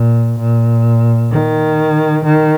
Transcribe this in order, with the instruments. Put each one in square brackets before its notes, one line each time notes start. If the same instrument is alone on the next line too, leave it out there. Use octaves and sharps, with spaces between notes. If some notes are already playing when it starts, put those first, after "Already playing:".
Already playing: [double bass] A#2
A#2
D#3
D#3